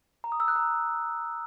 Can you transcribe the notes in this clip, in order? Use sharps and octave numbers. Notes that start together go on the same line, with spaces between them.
A#5
D#6
E6
F#6
A#5